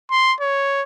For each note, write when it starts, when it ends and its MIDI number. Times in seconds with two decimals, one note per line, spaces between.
0.11 0.34 84
0.41 0.83 73